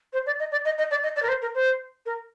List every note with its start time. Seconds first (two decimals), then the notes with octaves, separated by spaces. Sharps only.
0.13 C5
0.26 D5
0.40 D#5
0.52 D5
0.65 D#5
0.78 D#5
0.91 D5
1.03 D#5
1.16 D5
1.23 A#4
1.28 C5
1.42 A#4
1.55 C5
2.06 A#4